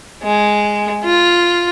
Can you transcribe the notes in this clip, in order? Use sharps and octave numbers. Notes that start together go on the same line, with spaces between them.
G#3
F4